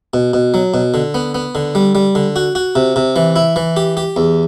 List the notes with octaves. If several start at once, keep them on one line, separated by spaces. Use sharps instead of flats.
B2
B2
F#3
B2
D3
B3
B3
D3
G3
G3
D3
F#4
F#4
C3
C3
E3
E4
E3
G4
G4
E2